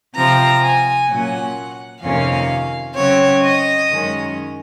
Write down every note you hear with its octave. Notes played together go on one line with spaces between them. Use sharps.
C3 F3 C4 A#5
G#5
A#2 F#3 C#4 F#5
F2 C3 D#3 A#3 C#4 F5
C#3 F#3 C4 C#5
D#5
F#2 D#3 G#3 C#4